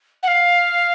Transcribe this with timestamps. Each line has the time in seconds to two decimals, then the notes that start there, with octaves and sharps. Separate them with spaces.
0.23 F#5
0.28 F5